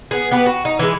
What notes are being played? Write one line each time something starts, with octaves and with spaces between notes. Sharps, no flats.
B3 G#4
B3 G4 B4
F#4
D#4
E3 G#3